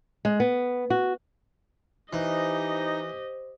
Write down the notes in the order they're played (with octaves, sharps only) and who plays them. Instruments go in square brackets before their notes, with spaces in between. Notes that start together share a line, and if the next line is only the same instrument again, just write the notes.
[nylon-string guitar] G#3
B3
F#4
[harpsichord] E3 [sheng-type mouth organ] D#4 [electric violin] G4 D#5 [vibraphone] C5